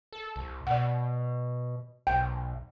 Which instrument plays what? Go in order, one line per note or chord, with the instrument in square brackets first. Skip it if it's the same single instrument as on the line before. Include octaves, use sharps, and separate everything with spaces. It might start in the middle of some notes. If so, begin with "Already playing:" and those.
[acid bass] A4
C2
[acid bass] B2 [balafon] D5 F#5
[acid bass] B1 [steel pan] G5